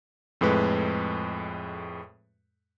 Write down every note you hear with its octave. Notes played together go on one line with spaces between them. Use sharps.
F2 A2 G#3 B4